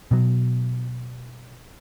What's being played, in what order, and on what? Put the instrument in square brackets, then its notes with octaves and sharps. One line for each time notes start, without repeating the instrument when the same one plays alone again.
[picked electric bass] B2 F#3